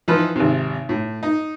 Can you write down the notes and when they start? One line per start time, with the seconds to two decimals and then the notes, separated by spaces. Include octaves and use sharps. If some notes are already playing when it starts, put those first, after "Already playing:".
0.08 E3 F3 D#4 F4 B4
0.36 G#1 C3
0.89 A2
1.23 D#4